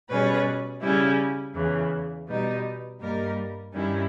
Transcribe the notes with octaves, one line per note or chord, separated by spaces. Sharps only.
B2 G3 C#4 G#4 B4
C#3 G3 C#4 E4
E2 C#3 E3
B2 G3 B3 D#4
G2 G3 A#3 D#4 A#4
G2 D#3 G3 C#4 E4